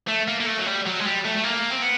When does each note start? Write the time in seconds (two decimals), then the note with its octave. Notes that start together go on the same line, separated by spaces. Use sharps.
0.08 A3
0.28 A#3
0.40 A#3
0.46 A3
0.58 F#3
0.66 G3
0.86 F#3
0.99 G#3
1.05 G3
1.25 A3
1.36 A3
1.43 A#3
1.71 C4
1.82 B3